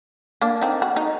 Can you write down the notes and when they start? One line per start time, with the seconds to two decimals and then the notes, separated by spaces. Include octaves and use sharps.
0.42 A#3 D4
0.61 C4 D#4
0.82 F#4
0.96 D#4